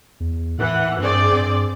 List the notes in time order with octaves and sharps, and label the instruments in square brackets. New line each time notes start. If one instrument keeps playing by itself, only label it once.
[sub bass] E2
[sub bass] A2 [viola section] E3 F#5
[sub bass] G2 [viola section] C4 G#4 D5
[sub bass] G2